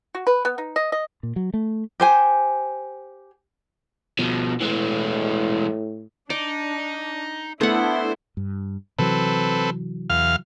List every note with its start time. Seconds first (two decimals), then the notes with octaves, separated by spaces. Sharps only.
0.15 F#4
0.27 B4
0.45 B3
0.58 D#4
0.76 D#5
0.92 D#5
1.23 A#2
1.36 F#3
1.54 A3
2.00 G4 C5 G#5
4.19 B2 F3
4.61 A2 E3 G#3
6.30 D4 D#4 D5
7.61 A3 B3 D4 E4 C5 F#5
8.37 G2
8.99 C3 E3 F#3 C4 A4 B4
10.10 E2 F5 F6